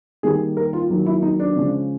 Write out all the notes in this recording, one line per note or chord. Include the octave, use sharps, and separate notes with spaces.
D#3 G3 A#3 G#4
A#4
F4
D#3 F#3 A#3
E4
D#4
D4
C#3 F3 G#3